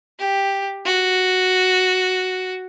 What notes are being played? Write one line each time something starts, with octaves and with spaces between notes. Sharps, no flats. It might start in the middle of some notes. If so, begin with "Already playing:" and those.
G4
F#4